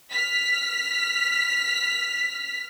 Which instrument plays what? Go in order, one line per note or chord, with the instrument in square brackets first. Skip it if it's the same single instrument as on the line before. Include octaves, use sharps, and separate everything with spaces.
[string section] F6 B6